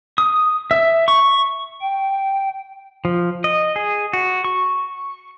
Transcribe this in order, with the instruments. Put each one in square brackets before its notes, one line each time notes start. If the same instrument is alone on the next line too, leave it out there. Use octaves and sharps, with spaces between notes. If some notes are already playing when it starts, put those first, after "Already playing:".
[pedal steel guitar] D#6
E5
C#6
[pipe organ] G5
[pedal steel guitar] F3
D#5
G#4
F#4
C#6